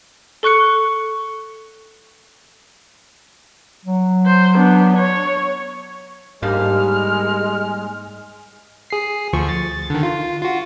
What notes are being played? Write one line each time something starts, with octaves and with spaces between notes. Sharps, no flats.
A4 C#6 F#6 C#7
F#3
C5
B3 D4
C#5
G#2 G3 G#3 A#3 D4 F6
G#4 C7
D2 F3 C#6
A6
D3 D#3
F4
F4 F#4